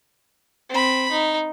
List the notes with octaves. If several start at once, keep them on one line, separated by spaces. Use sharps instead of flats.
C4 B5
D#4